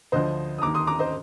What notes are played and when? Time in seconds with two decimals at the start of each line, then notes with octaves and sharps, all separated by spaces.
0.12 D2 D3 F3 C5 D#5
0.58 D#6
0.62 D#2 D#3 A#5 D6
0.74 C6 D#6
0.87 A#5 D6
0.99 C5 D#5